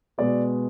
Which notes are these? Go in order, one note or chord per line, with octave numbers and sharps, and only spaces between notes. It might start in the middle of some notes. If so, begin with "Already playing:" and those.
B2 G#3 B3 D5